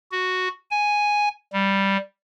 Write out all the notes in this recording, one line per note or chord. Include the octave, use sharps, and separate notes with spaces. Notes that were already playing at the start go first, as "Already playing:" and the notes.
F#4
G#5
G3